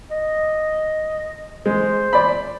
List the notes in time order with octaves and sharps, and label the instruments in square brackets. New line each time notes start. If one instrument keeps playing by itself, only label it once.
[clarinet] D#5
[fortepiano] G#3 [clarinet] C5
[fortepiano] D5 B5